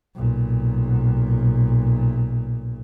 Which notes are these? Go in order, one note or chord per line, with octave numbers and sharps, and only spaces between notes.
B1 A#2